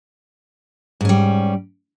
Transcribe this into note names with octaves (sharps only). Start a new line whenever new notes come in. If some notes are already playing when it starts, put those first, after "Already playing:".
G#2 G3 C#4